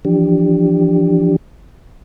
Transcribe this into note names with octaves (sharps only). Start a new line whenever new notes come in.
E3 F3 D4 G4